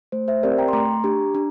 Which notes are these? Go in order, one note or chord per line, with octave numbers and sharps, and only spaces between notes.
A3 C5
C5 E5
C4 G4 A#4 D5
G5 A#5
C6
A3 A#5 D6
D4 G4
D4